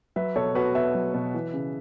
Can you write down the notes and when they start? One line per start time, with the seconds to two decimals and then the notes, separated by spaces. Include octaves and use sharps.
0.16 F#3 B4 E5
0.36 B2 A4 C#5
0.55 B2 F#4 B4
0.75 B2 B4 E5
0.95 F#3
1.14 B2
1.34 E3
1.54 C#3